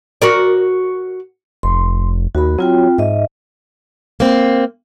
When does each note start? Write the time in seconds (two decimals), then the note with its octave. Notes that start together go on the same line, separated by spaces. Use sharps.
0.22 F#4 A#4 D5
1.63 F1 C6
2.35 D#2 F#4 B5
2.58 F#3 C4 F4 G5
2.98 G#2 D#5 E5
4.20 A#3 C4